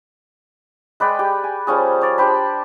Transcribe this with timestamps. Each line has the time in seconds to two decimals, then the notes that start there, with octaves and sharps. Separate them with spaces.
1.00 G#3 B4 D5 G5
1.19 G4
1.44 G#5
1.67 F3 G3 C#4 G#4
2.01 C#5 D5
2.18 D4 G4 C5 B5